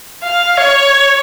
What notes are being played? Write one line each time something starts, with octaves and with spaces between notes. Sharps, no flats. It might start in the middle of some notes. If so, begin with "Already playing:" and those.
F5
C#5